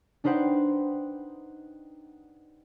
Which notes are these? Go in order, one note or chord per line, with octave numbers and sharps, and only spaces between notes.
D4 D#4 B4 C5 F#5 G5